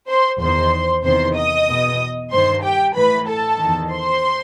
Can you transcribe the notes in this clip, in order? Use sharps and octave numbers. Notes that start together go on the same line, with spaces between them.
C5 C6
E2 D#3 C5 C6
E2 C3 D#3 C5 C6
D#5 D#6
E2 B2
G2 D#3 C5 C6
G4 G5
A2 E3 B4 B5
A4 A5
D#3
E2
C5 C6